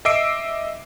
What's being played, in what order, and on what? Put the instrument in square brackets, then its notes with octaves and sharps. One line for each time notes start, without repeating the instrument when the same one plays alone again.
[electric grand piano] D#5 E5 D6 E6 C7 D7